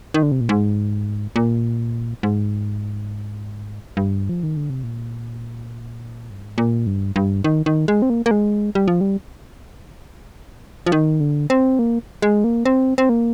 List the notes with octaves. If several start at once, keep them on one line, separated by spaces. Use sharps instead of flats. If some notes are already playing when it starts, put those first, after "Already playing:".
D#3
D3
C3
A#2
G#2
A#2
G#2
G2
F3
D#3
D3
C3
A#2
G2
G#2
A#2
G2
G2
D#3
D#3
G#3
C4
A#3
A#3
G#3
G3
F3
G3
F3
D#3
D3
C4
A#3
G#3
A#3
C4
C4
A#3